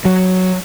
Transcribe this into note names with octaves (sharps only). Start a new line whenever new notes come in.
F#3